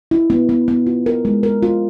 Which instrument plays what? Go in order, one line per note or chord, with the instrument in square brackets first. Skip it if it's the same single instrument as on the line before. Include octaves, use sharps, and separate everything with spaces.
[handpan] E4
B3
B3
B3
F4
A#4
G#3
A#4
F4